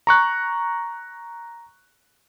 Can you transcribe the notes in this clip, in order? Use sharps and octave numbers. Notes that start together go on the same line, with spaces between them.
A#5 C#6 F#6